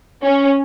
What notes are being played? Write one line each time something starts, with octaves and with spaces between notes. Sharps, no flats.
C#4